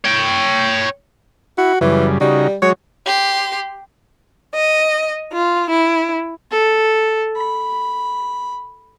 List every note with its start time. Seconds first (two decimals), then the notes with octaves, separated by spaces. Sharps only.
0.05 C#5 G5
1.58 E4 F#4
1.81 F#2 C#3 E3 G3
2.21 C#3 G3 D#4 F#4
2.62 F#3 G#3 F#4 C#5
3.06 G4 C6
4.54 D#5
5.32 F4
5.70 E4
6.51 A4
7.36 B5